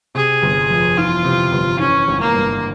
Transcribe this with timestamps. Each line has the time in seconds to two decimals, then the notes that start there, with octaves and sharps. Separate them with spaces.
0.15 C3 G#4
0.43 G1
0.70 F2
0.97 E3 F4
1.25 C3
1.52 G1
1.79 E3 C#4
2.08 G#1
2.21 A#3
2.34 G2